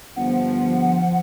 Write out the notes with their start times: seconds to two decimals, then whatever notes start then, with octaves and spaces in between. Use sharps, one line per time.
0.16 G1 F3 F#5